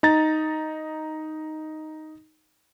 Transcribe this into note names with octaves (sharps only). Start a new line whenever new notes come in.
D#4 A#5 A6